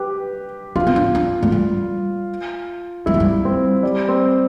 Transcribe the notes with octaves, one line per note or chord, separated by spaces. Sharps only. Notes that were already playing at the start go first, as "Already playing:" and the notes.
Already playing: G4 B4
D4 F4
C4
D4
D4
A3
G3
G3 E4
A3
G3
C4
G3
C4